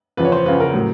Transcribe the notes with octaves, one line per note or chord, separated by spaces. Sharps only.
E2 C#3 F3 B4
C#5
C5
E2 C#3 F3 B4
A#4
A2 F#3